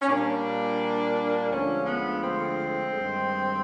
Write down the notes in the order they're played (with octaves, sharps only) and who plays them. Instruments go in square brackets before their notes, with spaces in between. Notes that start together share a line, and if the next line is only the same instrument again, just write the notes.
[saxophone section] C#4
A#2 G3 A#3 D4
D2 D3 F3 G#3 C#4
B3
C4
G2 D#3 G#3